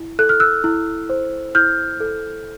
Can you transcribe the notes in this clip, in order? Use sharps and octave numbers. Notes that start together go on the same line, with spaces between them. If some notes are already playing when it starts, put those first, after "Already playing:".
Already playing: E4
A4 F#6
F6
E6 F#6
E4
C5
E4 F6 G6
A4